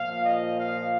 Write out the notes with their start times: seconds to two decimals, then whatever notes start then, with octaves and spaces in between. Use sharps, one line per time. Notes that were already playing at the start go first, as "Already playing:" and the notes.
Already playing: A#2 F3 F5
0.24 D#5
0.59 F5